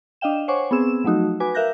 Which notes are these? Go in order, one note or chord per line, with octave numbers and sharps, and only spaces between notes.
D4 D#5 F5 G5 E7
C5 C#5 F#5 G#5 C#6 D6
B3 C4 G#4 E6 E7
F3 F#3 A3 D#4 F#4
F#4 B4 G#5 D6
A#4 E5 F5 F#6 G6 A#6